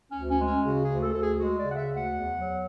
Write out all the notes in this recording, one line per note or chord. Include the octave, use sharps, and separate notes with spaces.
C#4
D2
C#4
G#3
C#4
C#3 F#4
G#4
D2
A4
D2 A4
G#4
G#3 F#4
D5
C#3
F#5
E5
D2
F#5
E2
F#3